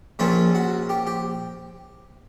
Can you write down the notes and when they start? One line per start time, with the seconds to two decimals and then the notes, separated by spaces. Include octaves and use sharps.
0.19 A#1 A#2 F3 A#3 C#4 F4
0.55 F#4
0.89 G4
1.07 G4